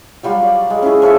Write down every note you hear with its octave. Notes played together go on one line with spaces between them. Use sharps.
F#3 G3 F4 F#4
D5
G#3
C#4 E4 G#4
F3 C#4 A4 E5